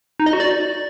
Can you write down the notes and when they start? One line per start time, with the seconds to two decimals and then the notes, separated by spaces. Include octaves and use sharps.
0.20 D#4
0.26 D#5
0.33 F#4
0.40 D5